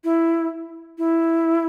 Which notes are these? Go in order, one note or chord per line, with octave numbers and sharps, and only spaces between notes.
E4
E4